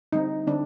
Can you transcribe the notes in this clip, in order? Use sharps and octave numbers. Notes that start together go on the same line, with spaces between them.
D3 G3 C4 D#4
D3 G3 C4 D4